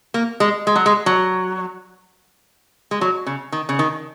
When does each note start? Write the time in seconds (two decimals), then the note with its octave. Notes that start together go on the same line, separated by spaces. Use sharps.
0.14 A#3
0.40 G#3
0.67 G#3
0.76 F#3
0.86 G#3
1.06 F#3
2.91 G#3
3.01 F#3
3.26 C#3
3.52 D#3
3.69 C#3
3.79 D#3